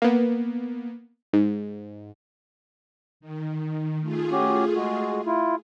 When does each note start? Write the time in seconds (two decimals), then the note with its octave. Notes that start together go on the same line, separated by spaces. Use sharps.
0.02 A#3 B3
1.33 G#2
3.20 D#3
4.01 A3 F4 G#4
4.32 C#4 F#4 G4
4.75 G#3 F#4
5.27 E4 F4